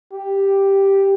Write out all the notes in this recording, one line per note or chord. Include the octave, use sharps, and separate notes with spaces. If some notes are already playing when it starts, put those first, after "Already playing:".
G4